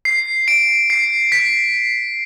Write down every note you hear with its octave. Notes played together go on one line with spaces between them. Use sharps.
C7
D7
C7
B6